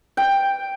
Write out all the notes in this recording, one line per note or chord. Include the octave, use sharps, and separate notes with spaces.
G5